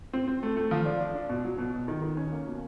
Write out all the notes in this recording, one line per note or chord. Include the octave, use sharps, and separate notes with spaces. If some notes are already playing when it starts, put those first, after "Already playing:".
C4
C4
A3
A3
F3
D4
D4
D4
B2
F#3
B2
B2
D#3
D#3
C#4
A#3
B2